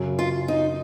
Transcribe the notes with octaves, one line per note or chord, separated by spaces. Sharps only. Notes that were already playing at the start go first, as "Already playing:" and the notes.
Already playing: F#2 C#3 F#3 C#4
F4
D#4